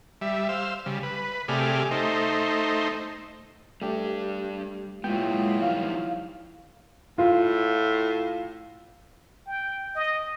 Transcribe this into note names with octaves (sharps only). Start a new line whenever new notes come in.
G3 E5
C5 F5 E6
C#3 G3
B4
C3 A3 G4 G#4 D5 F6
A3 D#4 C5
G3 A3 D4 G4
A#2 F#3 G#3 B3 E4 F4 G5
D#3 F3 G3 F5
A2 F4
G5
D#5